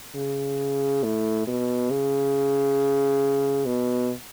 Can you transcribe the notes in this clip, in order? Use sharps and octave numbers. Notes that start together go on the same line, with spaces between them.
C#3
A2
B2
C#3
B2